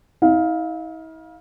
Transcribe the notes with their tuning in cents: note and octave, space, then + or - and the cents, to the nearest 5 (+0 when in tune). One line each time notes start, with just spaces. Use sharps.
E4 -45 F5 +10